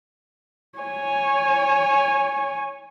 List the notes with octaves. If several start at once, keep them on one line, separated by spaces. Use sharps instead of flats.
C#5 G#5